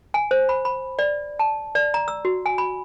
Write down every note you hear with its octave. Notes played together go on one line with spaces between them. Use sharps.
G#5
C5
B5
B5
D5
A5
D5
A#5
E6
F#4
G#5
B5